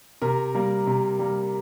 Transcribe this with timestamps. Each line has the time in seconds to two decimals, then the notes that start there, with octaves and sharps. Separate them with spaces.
0.22 C3 A#4
0.54 G3 A#3
0.87 C3
1.19 G3 A#3